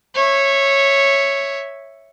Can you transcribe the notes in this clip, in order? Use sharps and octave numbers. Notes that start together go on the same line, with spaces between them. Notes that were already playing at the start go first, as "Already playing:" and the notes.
C#5 E5